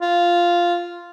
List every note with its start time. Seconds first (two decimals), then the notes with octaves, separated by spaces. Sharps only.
0.01 F4